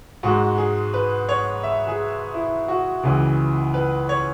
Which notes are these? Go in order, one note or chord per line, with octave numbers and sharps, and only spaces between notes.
G#2 G#3 F#4
G#4
B4
C#5
E5
G#4
E4
F#4
C#2 C#3 E3
B4
C#5